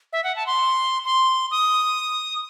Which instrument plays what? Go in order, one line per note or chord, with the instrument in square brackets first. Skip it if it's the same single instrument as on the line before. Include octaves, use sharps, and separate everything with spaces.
[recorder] E5
F#5
A5
C6
C6
D#6